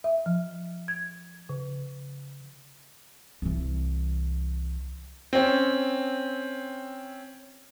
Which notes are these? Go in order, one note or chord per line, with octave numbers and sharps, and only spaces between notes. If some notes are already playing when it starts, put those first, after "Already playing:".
E5
F3
G#6
C#3
C2 E3
C4 C#4